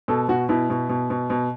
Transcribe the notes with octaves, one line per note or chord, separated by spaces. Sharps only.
B2 A4
B2 F#4
B2 E4
B2
B2
B2
B2